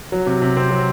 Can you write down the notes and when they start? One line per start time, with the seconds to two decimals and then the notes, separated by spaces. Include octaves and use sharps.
0.12 F#3
0.26 C3
0.42 C3
0.57 C4
0.71 F#3